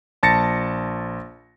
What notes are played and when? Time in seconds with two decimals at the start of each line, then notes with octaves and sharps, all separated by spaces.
0.23 A#1 A5 A6 A#6 C#7